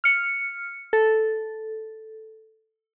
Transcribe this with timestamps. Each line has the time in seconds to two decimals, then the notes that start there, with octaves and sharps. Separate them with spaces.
0.04 F6 C#7
0.93 A4